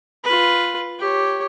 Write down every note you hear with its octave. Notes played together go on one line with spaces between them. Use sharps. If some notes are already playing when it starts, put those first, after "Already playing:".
F4 B4
G4 C#5